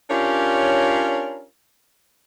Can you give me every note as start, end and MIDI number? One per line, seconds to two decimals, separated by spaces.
0.10 1.43 61
0.10 1.43 62
0.10 1.43 65
0.10 1.43 67
0.10 1.43 70
0.10 1.43 73